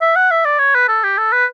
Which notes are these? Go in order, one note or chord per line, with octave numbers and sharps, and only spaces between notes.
E5
F#5
E5
D5
C#5
B4
A4
G4
A4
B4